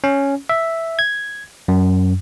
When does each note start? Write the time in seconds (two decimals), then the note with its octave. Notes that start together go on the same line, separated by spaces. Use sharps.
0.04 C#4
0.49 E5
0.99 G#6
1.68 F#2